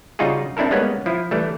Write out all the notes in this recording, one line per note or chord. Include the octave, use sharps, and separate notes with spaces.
C#3 G3 D#4 F4 F#4 G#4
C4 D4 E4 A4 A#4
G3 G#3 A#3 B3 C#4 B4
F3 E4
E3 G3 A3